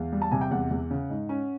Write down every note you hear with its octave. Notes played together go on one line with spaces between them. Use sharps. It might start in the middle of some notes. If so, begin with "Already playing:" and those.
Already playing: E2 F5
G3
A5
C3 G#5
G5
E2 F#5
E2
C#3
G#2
C#4